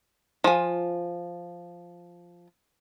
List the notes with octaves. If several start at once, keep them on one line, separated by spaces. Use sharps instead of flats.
F3 F4 G#5